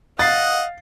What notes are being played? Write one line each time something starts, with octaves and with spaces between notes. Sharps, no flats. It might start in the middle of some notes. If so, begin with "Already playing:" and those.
D#5 F5 F#5 A6 C7